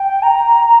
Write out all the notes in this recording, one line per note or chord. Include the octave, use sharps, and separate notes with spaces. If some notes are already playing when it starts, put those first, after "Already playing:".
Already playing: G5
A#5